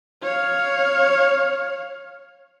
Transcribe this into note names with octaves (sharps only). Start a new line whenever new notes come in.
C#5 F5